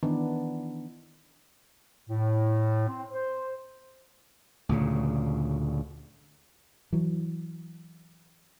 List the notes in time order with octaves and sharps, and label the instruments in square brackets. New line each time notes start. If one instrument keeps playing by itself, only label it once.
[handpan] D#3 E3 B3 D4
[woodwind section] A2
C4
C5
[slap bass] D2 A#2 C#3
[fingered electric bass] E3 F#3